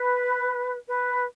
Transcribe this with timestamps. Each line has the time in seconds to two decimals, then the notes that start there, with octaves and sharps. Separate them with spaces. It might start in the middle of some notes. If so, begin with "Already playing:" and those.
Already playing: B4
0.87 B4